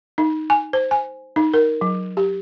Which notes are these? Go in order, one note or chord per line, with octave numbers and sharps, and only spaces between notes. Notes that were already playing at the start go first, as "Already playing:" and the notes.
D#4
G#5
C5
G#5
D#4
A#4
F#3
G4